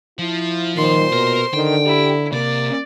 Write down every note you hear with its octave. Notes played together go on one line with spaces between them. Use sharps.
F3 E4
A#2 D#3 C5 C6
B2 A#4
D3 D#3 G5
E4 G4
C3 A#3 D5